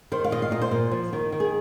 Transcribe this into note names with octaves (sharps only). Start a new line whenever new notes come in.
D#3 C5
F5
A#2 D#5
F5
A#2 D#5
C5
A#2
F3
D#3
D#3
G#4